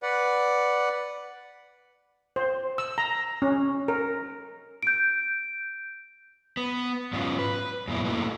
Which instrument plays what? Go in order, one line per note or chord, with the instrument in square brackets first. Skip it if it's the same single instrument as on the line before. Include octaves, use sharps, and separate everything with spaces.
[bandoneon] B4 D5 F#5
[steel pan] C5
E6
A#5
C#4
A#4
[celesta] G6 D7
[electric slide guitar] B3
G#2 F#3 B3 C#4 D#4 F4
B4
F#2 A#2 B3 E4
A3 A#3 D#4 E4 F#4